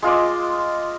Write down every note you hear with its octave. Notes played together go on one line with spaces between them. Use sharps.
G#3 F4 D#5 D6